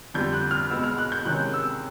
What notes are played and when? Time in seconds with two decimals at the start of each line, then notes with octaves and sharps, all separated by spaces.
0.14 F2 D3 G3 G6
0.33 F#6
0.51 F6
0.70 B2 G#3 B3 E6
0.84 F6
0.98 F#6
1.12 G6
1.25 C3 D#3 G#3 C#4 F#6
1.54 E6